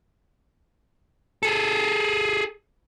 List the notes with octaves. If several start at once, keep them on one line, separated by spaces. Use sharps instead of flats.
G#4 A4